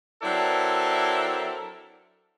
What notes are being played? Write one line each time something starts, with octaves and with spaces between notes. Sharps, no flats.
F#3 C4 D4 E4 A4 A#4